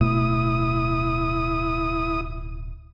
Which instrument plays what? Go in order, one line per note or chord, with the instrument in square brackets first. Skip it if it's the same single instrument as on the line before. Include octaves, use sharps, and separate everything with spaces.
[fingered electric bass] D1 B2 A3 [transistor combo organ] E4 D#6